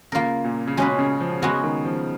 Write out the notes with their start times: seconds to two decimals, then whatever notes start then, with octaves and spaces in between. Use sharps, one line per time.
0.12 C#3 A#3 F4 A#4
0.44 A#2
0.67 C#3
0.77 B2 G#3 C#4 G#4 B4
0.99 C#3
1.20 F3
1.42 C#3 G#3 B3 F#4
1.64 D#3
1.85 F3